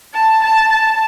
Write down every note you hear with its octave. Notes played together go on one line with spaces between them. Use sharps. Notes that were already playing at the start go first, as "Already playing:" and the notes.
A5
A5
A5